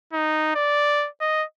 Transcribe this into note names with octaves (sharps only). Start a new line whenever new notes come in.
D#4
D5
D#5